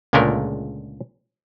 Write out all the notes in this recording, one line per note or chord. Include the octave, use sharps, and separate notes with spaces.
C#2 A#2 D3 G#3 A3 A#4